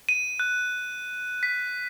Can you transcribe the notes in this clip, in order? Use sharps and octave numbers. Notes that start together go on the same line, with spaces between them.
D#7
F#6
B6